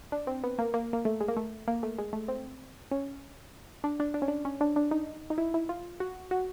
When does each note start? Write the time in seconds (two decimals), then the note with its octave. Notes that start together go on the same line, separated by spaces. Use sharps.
0.12 D4
0.27 C4
0.44 B3
0.59 A#3
0.74 A#3
0.93 A#3
1.05 A3
1.20 G#3
1.28 A#3
1.37 A3
1.68 A#3
1.83 A3
1.98 G#3
2.13 A3
2.28 C4
2.91 C#4
3.84 D4
4.00 D4
4.14 D4
4.22 C#4
4.28 D4
4.45 C#4
4.61 D4
4.76 D4
4.91 D#4
5.30 D#4
5.38 E4
5.54 E4
5.69 F4
6.00 F#4
6.31 F#4